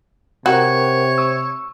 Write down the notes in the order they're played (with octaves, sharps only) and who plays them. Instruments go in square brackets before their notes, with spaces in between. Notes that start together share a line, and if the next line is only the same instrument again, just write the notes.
[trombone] C3 [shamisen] F#4 [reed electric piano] A#4 F#5 G5 [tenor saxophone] C#5
[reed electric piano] C#6 E6